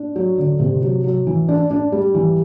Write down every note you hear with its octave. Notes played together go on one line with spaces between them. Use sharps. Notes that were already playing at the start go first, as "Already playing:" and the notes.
Already playing: D4
F#3
D3
C3
F#3
F#3
E3
D4
D4
G3
E3